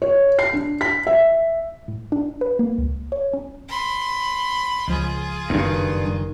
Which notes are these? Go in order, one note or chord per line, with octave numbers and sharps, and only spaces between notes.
C#5
C7
D4
B6
E5
A2
D4
B4
A#3
C#2
C#5
C#4
B5 C6
C#2 F3 F4 G#4
F#1 E2 G2 D#3